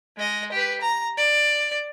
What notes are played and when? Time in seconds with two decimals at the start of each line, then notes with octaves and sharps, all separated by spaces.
0.17 G#3 D#5
0.52 G4 B4
0.81 A#5
1.18 D5